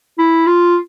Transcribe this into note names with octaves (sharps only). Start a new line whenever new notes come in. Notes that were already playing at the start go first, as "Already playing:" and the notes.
E4
F4